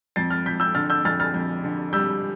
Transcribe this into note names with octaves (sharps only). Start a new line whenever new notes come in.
F2 A6 C7
F6 A6
F2 G6 B6
E6 G6
D3 F6 A6
E6 G6
F2 F6 A6
F6 A6
F2
D3
G3 E6 G6